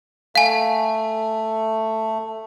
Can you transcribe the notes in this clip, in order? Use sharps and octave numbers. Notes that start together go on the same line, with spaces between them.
A3 F5 G#5